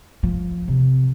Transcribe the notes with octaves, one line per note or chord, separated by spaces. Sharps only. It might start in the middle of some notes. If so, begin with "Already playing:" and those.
F3
C3